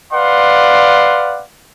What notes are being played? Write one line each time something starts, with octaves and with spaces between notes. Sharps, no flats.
B4 D5 F5 F#5 C6